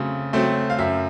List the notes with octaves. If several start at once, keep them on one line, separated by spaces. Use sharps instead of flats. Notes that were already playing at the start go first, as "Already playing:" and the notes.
Already playing: C#3 F#3 A3 C4
F#3 A3 C4
F5
F#2 E5